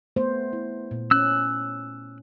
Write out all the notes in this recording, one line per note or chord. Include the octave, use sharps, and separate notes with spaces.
A3 B3 C5
E4
A#2
C#4 E6 F#6